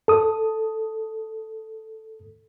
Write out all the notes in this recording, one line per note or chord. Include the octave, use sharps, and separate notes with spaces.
A4 D#6